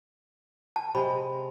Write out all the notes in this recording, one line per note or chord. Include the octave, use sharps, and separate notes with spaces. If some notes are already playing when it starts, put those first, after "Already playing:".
A5
C3 G#3 B5